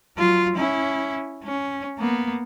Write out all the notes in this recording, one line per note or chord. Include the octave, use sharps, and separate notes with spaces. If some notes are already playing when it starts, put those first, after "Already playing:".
F#3 F4
C#4 E4
C#4
A#3 B3